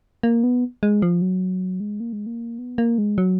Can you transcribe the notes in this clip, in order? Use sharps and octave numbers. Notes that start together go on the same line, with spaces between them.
A#3
B3
G#3
F3
F#3
G#3
A#3
G#3
A#3
B3
A#3
G#3
F#3